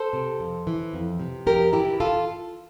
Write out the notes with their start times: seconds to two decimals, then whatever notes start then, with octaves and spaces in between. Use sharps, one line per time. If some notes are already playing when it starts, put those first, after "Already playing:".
Already playing: A4 C5
0.13 C3
0.40 F2
0.67 E3
0.93 F2
1.20 C3
1.46 F2 G4 A#4
1.73 E3 E4 G4
2.00 F4 A4